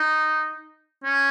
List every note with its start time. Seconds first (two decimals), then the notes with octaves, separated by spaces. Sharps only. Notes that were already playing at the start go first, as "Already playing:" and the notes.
Already playing: D#4
1.04 C#4